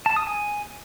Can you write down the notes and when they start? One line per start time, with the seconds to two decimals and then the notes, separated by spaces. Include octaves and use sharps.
0.06 A5
0.16 D#6
0.27 G#5